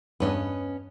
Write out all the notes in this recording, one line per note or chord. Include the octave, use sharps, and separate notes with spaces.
E2 G2 B3 C#4 D#5